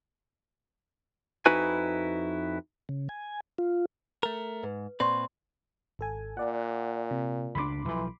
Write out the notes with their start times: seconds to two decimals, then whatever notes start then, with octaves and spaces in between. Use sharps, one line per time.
1.46 F2 D#4 E4 F#4 B4 G#5
2.89 C#3
3.09 G#5
3.58 F4
4.23 A3 A#4
4.63 G#2 B4
5.00 A#2 C4 B4 D5 C6 C#6
5.99 G#1 A4 G#5
6.37 A#2 D5 F#5
7.11 C3
7.55 C#2 F3 D4 B5 C6 D6
7.85 B1 E3 F3